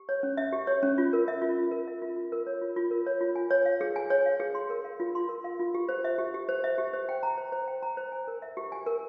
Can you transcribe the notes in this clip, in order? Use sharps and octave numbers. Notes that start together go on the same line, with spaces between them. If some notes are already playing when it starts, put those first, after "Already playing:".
Already playing: G4
C#5
C#4
E5
G4
C#5
C#4
F4
A#4
E5
F4
F4
A#4
E5
F4
F4
A#4
C#5
F4
F4
A#4
C#5
F4
G#5
C#5
F5
G#4
G#5
C#5
F5
G#4
C6
A#4
F5
F4
C6
A#4
F5
F4
G4
C5
E5
G4
G4
C5
E5
G4
C5
G5
A#5
C5
C5
G5
A#5
C5
G#5
A#4
E5
G4
G#5
A#4